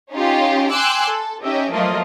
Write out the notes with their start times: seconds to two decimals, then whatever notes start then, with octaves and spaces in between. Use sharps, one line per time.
0.11 C#4 D#4 F4 G4
0.70 G5 G#5 C6 D6 E6 F#6
1.08 A4
1.41 C#4 D#4 G4 D#5 E5
1.71 F3 F#3 A3 A#3 F4 D#5